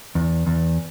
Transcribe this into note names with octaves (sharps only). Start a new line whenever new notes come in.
E2
E2